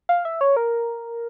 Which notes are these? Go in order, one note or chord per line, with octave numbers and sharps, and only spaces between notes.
F5
E5
C#5
A#4